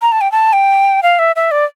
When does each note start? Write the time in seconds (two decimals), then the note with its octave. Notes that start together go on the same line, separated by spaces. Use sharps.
0.02 A#5
0.12 A5
0.21 G5
0.32 A5
0.53 G5
1.03 F5
1.19 E5
1.36 E5
1.51 D5